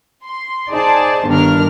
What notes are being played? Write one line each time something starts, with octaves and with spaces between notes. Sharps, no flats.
C6
D#4 G#4 C5 D5 A5
G1 G2 D#3 D4 A#4 F6